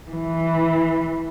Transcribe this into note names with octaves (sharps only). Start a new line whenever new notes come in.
E3